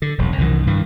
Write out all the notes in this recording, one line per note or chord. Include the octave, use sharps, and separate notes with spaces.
D3
E1 B1 F#2
C2 F#2 D#3 E3
G2 D#3 E3